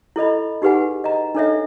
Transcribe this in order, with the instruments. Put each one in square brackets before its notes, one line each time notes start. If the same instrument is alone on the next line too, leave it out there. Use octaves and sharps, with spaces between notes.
[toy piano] E4 A4 D#5 B5
D#4 G4 G#4 B4 F#5 G#5
D#5 A#5
D4 D#4 A4 C#5 D#5 E5